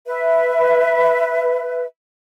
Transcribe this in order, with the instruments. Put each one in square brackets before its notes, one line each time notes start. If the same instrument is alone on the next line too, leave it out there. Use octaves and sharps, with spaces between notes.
[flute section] B4 E5